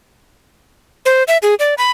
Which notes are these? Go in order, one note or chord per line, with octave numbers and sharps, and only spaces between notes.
C5
E5
G#4
D5
B5